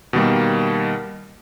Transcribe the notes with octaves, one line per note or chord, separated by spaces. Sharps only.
B2 D#3 G3 A#3